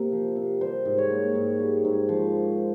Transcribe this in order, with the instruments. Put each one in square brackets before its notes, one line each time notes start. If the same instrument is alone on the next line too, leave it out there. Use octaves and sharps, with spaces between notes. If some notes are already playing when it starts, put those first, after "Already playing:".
Already playing: [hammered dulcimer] C3 A#3 C5
F3
C3
G3 C5
G#2
C#5
A#3
G#2
G3
G#2
F3